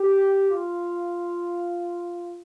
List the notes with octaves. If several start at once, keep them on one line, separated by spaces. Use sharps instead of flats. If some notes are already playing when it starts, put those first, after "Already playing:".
Already playing: G4
F4